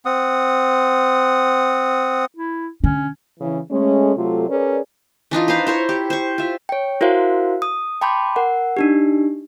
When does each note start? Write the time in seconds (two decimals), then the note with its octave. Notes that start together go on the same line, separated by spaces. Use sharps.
0.05 C4 F#5 D#6
2.37 E4
2.84 D3 C#4
3.40 C#3 E3
3.71 G#3 A3 C#4
4.16 C3 F#3 A3 F4 A4
4.49 C#4 G#4 A#4 B4 D5
5.31 E3 D4 D#4 F4
5.48 B4 C5 F5 A#5
5.67 E4 C5 C#5
5.89 G4
6.10 C5 C#6
6.38 F4 E5
6.69 C#5 G5
7.01 E4 F#4 A#4 C5 F5
7.62 D#6
8.02 G5 A5 B5 C6 D6 G6
8.36 A#4 F#5
8.77 D4 D#4 G4